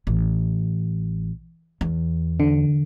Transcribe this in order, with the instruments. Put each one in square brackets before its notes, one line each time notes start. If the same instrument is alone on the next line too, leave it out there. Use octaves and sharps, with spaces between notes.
[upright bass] A1
E2
[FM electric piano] D3